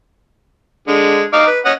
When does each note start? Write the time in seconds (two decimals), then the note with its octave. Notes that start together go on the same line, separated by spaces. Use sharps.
0.88 D3 G#3
1.33 D#4 F5 D6
1.47 B4
1.65 C#4 D#5 F#5